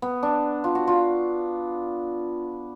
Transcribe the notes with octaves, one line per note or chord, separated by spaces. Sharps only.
B3
D4
F4
F#4
F4